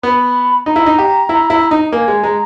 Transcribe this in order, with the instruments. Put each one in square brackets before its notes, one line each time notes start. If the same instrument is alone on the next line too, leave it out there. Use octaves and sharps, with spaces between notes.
[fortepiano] B3 [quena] B5
[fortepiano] D#4 [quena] A#5
[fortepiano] E4
D#4
G4
E4
E4
D#4
[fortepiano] A#3 [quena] G#5
[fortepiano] G#3
[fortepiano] G#3 [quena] A#5